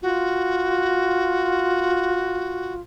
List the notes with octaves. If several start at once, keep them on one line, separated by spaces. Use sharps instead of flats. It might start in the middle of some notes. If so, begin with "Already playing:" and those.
F4 F#4